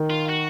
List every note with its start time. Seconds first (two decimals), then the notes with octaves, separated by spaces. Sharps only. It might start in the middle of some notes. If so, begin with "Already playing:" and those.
Already playing: D#3
0.10 F4
0.29 F#4